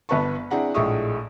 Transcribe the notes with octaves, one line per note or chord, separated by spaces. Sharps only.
G1 B3 B4 E5 A5 C#6
C4 D4 E4 G#4 F#5 A#5
A#1 A2 G#3 E5 C#6 D#6